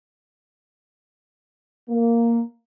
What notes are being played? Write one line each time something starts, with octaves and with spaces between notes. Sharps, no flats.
A#3